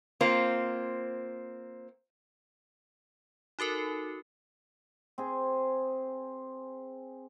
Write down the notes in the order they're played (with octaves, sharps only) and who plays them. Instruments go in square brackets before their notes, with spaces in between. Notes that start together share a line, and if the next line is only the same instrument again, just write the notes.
[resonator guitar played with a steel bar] A#3 C4 F4 C5
[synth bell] D#4 F#4 A4 A#4
[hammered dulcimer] C4 G#4